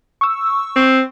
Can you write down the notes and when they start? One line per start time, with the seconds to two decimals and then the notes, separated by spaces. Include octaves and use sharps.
0.21 C#6 E6
0.76 C4